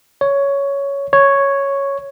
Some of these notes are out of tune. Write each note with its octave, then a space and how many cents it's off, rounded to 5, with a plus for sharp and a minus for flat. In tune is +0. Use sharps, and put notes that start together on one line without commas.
C#5 +10
C#5 +0